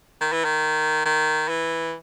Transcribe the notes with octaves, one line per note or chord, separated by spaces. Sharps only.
D#3
E3
D#3
D#3
E3